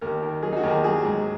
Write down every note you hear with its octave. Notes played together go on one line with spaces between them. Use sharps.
D#2 A#4
D#3
F#3 G#4
D#4
F#4
D#2 A#4
G#4
F#3 G#4
G#2